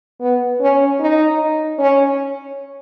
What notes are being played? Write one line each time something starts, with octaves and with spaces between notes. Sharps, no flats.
B3
C#4
D#4
C#4